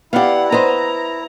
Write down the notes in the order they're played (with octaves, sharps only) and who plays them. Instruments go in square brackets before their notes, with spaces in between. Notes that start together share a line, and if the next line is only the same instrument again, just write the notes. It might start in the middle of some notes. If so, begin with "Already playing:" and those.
[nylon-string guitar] B3 G4 [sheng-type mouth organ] E4 [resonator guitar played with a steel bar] D5 F5 [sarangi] F#5
[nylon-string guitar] B4 C5 [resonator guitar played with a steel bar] D#5 [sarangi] A#5